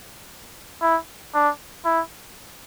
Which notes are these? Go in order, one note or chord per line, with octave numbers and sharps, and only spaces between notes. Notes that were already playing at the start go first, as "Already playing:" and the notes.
E4
D4
E4